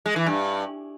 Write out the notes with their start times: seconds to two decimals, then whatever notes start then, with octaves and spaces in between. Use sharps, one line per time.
0.06 G#3
0.16 E3
0.26 G2